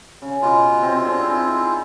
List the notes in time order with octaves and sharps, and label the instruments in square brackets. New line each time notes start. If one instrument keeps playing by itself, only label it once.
[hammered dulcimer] C#3
[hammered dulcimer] B2 B4 D6 [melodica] F4
[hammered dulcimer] C3 C4 E5
D3 G#4
D#4 E4